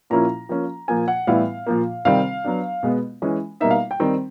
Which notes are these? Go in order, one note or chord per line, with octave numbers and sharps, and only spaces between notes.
A#2 F3 A#3 C#4 E4 A#5
F3 A#3 C#4
A#2 F3 A#3 G#5
F#5
A2 E3 G3 B3 E4 F5
A#2 F3 A#3
C3 D#3 G3 C4 F5
F#3 B3 D4
B2 G#3 B3
E3 G#3 C#4
B2 G3 A#3 D#4 E5
F5
G5
D#3 G3 C4